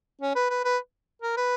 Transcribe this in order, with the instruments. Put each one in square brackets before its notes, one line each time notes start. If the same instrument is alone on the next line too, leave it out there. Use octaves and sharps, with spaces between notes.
[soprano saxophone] C#4
B4
B4
B4
A#4
B4